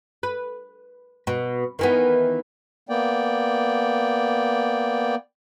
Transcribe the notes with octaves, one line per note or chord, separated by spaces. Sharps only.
B4
B2
D#3 E3 B3
A#3 B3 D5 G5